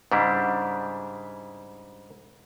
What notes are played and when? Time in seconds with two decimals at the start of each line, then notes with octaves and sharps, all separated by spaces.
0.12 G#2 C#3 G3 D4 E4